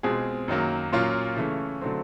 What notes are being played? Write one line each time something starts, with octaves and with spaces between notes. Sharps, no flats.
B2 G#3 C4 F4 G#4
F#2 D#3 F#3 A#3
A#2 F#3 A#3 C#4 F4
C#3 E3 A3 C#4
D3 F#3 A3 C4